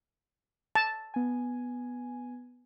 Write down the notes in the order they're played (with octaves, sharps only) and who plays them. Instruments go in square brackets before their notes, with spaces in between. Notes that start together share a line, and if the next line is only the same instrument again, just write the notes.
[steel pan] A5
[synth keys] B3 G#5